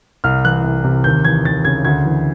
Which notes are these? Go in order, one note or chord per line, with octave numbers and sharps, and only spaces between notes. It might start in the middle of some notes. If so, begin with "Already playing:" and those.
C2 F6
E3 F#6
C2
C3
D#2 G6
E3 G#6
D#2 A6
C#3 G#6
D2 G#6
E3